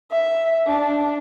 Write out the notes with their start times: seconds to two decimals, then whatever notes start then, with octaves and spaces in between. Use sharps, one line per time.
0.11 E5
0.67 D4